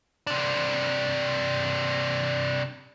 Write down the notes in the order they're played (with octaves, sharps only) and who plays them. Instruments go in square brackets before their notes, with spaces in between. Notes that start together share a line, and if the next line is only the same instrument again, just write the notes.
[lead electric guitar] C3 D4